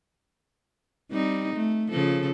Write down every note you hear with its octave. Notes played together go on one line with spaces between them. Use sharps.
G3 C4 D#4
A3
C#3 F3 A4